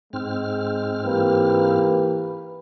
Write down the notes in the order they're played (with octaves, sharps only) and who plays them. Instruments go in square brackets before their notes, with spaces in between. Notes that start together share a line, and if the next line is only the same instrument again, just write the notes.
[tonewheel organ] G#2 C4 F6 [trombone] G#3
[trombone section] E3 A#3 G4 [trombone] B4